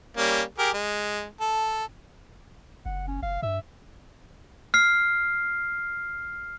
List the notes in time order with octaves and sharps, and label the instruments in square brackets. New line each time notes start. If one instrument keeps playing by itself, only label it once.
[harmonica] G3 A#3 C#4
G4 G#4 A#4
G#3
A4
[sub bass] F#1 [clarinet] F#5
[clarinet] C#4
[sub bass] F#1 [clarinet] F5
[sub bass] G2 [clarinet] E5
[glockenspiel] F6 C7